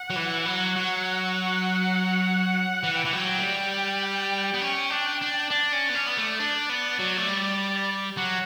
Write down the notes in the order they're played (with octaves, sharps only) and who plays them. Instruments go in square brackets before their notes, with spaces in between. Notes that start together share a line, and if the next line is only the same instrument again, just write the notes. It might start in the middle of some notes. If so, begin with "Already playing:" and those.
Already playing: [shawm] F#5
[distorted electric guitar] F#3
E3
F#3
F#3
E3
[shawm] G5
[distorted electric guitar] E3 [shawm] F#5
[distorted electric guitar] F#3 [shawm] G5
[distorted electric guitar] A3
G3
B3
C#4
D4
D4
[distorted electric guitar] D4 [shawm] D5
[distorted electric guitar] C#4
B3
C#4
B3
A3
D4
B3
F#3
A3
G3
[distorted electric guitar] F#3 [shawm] F#5